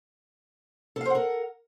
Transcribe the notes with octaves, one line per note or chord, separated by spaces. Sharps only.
A4 A#4 C5 F5 F#5